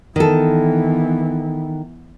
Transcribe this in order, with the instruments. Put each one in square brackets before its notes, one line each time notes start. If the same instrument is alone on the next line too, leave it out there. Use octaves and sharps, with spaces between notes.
[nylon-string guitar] D#3 A4 [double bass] E3 B3